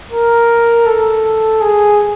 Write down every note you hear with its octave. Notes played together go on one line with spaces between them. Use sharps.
A#4
A4
G#4